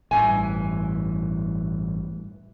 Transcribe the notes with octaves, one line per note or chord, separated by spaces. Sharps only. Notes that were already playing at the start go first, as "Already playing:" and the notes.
A1 G2 E3 G#5